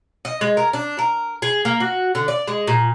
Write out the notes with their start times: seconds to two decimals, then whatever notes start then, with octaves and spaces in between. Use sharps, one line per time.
0.25 D#5
0.41 G#3
0.57 A#4
0.73 D4
0.99 A#4
1.42 G#4
1.65 A#3
1.80 F#4
2.15 D3
2.28 D5
2.47 G#3
2.67 A#2